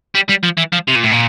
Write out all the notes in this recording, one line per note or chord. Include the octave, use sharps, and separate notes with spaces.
G3
G3
F3
E3
F3
C3
A#2
A2
A#2